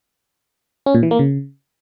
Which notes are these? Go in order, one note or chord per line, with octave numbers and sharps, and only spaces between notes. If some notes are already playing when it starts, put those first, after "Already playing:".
C#4
A#2
E3
A#3
C#3